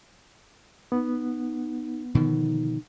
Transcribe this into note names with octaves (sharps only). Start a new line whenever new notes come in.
B3 D#4
B2 D3 D#3 F3 D#4